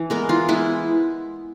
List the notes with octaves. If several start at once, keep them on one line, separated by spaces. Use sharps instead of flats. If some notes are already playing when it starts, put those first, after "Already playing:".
Already playing: E3
G#3 B3 A#4
E3 F4
G#3 B3 E4